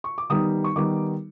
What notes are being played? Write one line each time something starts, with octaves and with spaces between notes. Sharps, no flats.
C#6
D6
D#3 G3 B3 D#4 D#6
C#6
D#3 G3 B3 D#4 D6